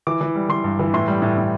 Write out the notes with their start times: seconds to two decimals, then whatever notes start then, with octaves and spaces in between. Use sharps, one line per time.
0.07 E3 D6
0.21 E3
0.36 G3
0.49 E3 C6
0.64 G2
0.79 E3
0.93 A2 C6
1.08 G3
1.22 A2
1.38 A2